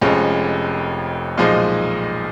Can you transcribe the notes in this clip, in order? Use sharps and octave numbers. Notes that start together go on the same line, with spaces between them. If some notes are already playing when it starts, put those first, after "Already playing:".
F1 F2 F3 G#3 C#4
B1 A#2 F3 G#3 D#4